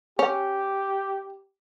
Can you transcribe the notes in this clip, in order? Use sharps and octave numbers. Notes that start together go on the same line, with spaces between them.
C#4 G4